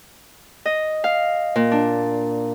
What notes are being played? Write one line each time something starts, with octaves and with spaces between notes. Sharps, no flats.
D#5
F5
A#2
D4